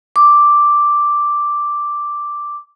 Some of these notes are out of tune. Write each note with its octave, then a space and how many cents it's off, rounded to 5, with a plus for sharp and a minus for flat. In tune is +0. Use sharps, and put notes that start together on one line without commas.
D6 +0